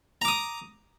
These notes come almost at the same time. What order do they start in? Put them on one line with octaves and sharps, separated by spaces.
A#5 D6 D#6